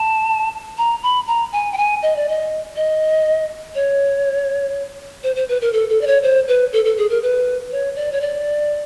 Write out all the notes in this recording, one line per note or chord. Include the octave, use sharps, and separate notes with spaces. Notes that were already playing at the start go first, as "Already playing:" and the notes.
Already playing: A5
A#5
B5
A#5
G#5
G5
G#5
D#5
D5
D#5
D#5
C#5
C5
C5
B4
A#4
A4
A4
D5
C#5
C5
B4
A4
A4
G#4
A#4
B4
C#5
D5
C#5
D5